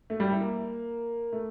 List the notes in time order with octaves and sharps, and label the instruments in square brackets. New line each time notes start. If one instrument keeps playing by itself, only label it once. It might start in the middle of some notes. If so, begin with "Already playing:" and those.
[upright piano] A3
G3
E4
A#3
A3